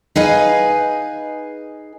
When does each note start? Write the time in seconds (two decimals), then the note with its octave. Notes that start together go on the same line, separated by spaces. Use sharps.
0.16 D#4 G#4 B4 D#5 F5 G#5